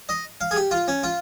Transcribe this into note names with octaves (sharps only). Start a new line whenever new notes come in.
D#5
F5
G#4
G4
F4
C#4
F4